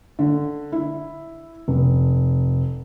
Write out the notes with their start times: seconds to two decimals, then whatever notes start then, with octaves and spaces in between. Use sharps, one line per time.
0.19 D3
0.72 E4
1.68 F1